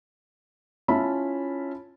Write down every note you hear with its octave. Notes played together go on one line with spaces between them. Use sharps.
C#4 E4 F4 E5 A5 B5